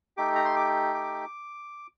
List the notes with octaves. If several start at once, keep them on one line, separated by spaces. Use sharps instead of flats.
A3 D#4 G4 D6
A#5
C6
D6
D6